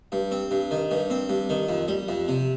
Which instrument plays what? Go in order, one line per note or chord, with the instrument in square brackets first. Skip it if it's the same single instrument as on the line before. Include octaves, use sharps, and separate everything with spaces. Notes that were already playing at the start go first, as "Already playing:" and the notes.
[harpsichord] G2
C4
G2
D#3
G2
C4
G2
D#3
F2
G3
F2
C3